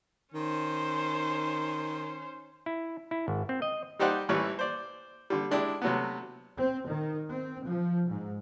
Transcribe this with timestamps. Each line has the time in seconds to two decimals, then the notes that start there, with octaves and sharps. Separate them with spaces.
0.34 D#3 C#4 C5
2.66 E4
3.11 E4
3.28 G#1
3.49 C4
3.62 D#5
3.99 G3 D#4 G4 C5 D5 F#5
4.29 A1 E3 G3 B4 C#5
4.59 C5 D5
5.30 D3 G3
5.51 G#3 D4 E4 G4
5.82 C3 F#3 A3 B3
6.56 C4
6.88 D#3
7.30 C4
7.67 F3
8.09 G#2